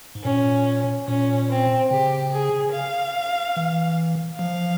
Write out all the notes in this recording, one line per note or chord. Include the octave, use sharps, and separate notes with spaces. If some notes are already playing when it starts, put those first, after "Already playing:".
G#2
A#2 C#4
A#2 C#4
C4
C#3 G4
G#4
F5
E3
F3 F5